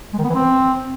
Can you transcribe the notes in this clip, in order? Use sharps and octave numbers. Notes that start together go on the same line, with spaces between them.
G#3
D#3
B3
E3
C4